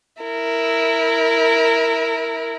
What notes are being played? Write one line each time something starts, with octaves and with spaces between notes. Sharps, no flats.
E4 A#4